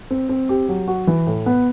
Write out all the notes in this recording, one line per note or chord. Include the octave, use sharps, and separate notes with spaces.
C4
C4
G4
F#3
F#4
E3
A2
B3